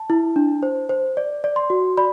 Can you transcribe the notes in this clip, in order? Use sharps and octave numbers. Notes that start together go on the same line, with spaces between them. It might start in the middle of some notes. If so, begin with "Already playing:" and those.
Already playing: A5
E4
D4
C5
C5
D5
D5
C6
F#4
D5 B5